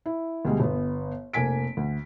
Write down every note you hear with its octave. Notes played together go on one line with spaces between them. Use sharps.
E4
D2 B2 G3 G#3
G1 B3
F1 A#3 G#5 B6 D7
D2